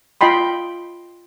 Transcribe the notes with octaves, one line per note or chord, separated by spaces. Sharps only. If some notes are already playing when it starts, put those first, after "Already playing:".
F4 D#5 G5 B5 C6